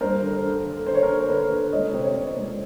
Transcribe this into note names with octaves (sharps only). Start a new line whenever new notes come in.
G2 A#4 C5
D3
D3
D3
D3 C5
C#5
A#4 C5
D3
D3 B4 C#5
D3
C#2 C#5 D#5
C3 C5
C#5
C3 C5 D5
C#2